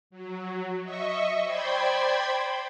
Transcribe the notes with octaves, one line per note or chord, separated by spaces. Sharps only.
F#3
D#5 E5 C#6
C5 D5 G5 B5 C6 G#6